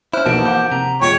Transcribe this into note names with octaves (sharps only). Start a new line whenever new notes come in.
C#4 E4 C5 F6 F#6
B1 B2 E3 F3 A#3 B3 A5 D7
F#5 D6 G6
C3 A#5
E2 B2 G#3 F4 C#5 G5